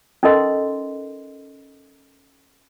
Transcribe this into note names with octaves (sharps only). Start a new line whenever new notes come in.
C#4 D#4 A4 A#4 D#5 C6